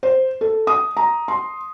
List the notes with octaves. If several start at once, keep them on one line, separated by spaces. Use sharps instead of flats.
C5
A4
D#6
A#5
C6